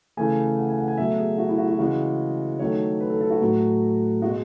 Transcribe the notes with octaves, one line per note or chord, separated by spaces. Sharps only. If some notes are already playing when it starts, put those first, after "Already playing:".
C#3 E3 A3 G#5
F#5
G#5
F#5
G#5
B2 F#3 A3 E5
G#4
F#4
E4
F#4
F#4
C#3 E3 G#3 F#4
D#3 F#3 A3 C#5
B4
A4
A4
F#4
A2 F#3 A3
B2 G#3 F#4